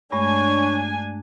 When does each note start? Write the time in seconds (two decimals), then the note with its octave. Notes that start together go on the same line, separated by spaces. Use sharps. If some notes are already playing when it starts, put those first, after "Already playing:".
0.12 G2 G#3 A3 D4 C#5 G#5